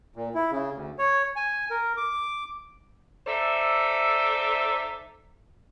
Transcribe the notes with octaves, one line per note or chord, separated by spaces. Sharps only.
A#2
E4
C#3
D2
C#5
G#5
A#4
D6
D#4 A4 C5 D5 E5